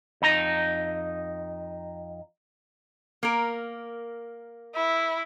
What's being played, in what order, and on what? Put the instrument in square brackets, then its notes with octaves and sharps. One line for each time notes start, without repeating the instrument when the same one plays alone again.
[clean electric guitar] F2 D#4 A#5
[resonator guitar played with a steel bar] A#3 A#4
[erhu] E4